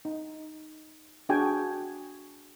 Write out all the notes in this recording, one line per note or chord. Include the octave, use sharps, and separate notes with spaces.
D#4
D4 F#4 G#4 G5 G#5